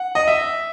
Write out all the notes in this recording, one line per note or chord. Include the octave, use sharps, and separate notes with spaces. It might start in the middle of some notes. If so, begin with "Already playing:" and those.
Already playing: F#5
D#5
E5